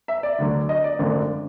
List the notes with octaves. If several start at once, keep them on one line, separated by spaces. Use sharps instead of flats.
E5
D5
D2 D3 F#3
D#5
D5
G#1 F#2 D3 F3 A3